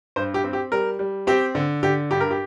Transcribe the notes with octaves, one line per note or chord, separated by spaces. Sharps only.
G2 C5
G4
C4
G4
G3 A#4
G3
C4 G4
D3
D3 G4
G2 G4
A#4
G4